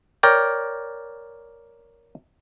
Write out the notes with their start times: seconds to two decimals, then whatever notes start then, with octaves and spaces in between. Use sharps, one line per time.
0.23 A#4 C#5 D5 G5